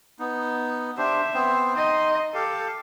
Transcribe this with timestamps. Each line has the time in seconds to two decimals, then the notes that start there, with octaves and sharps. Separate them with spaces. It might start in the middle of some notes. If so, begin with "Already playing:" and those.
0.19 B3 D#4
0.98 D4 G4 C5 E5
1.34 B3 C4 C5
1.76 D#4 D#5 C6
2.34 G4 A4 F5